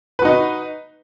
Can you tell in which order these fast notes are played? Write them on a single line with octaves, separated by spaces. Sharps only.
B4 F#4 D#4